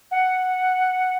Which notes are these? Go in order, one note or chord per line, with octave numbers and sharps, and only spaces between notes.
F#5